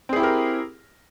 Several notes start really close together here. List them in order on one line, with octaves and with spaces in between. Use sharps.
C4 G#4 E4 G4 A#4